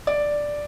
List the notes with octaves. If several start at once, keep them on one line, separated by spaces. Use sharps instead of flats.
D5